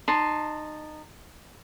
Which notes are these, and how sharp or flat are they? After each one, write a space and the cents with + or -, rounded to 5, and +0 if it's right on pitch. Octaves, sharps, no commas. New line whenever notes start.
D#4 -25 A5 +0 C6 +0